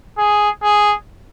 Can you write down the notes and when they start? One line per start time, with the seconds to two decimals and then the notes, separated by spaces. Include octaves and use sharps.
0.18 G#4
0.63 G#4